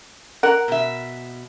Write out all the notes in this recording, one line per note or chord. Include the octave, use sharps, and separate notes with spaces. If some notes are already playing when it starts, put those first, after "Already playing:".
A#4 F#5
B2 E5